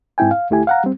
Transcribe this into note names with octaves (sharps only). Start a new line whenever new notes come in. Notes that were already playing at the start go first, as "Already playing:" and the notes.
G#2 C4 E4 G5 G#5
F5
D2 A3 E4 G4 G#5
F5 F#5 A#5
G3 C4